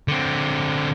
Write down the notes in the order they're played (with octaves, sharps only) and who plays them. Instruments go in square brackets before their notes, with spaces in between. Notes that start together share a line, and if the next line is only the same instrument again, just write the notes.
[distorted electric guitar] D3 C4